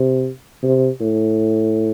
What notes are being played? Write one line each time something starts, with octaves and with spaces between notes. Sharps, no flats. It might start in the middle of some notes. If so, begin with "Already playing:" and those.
Already playing: C3
C3
A2